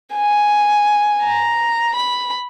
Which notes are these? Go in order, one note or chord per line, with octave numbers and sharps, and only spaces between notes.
G#5
A#5
B5